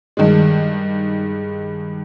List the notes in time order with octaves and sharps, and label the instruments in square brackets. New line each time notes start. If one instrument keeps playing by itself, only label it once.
[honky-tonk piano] G2 D#3 G#3